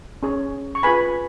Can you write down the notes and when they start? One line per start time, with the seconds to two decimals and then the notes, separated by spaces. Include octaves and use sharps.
0.23 C#4 G#4 C#5
0.75 C#6
0.83 F4 G#4 B4 G#5 B5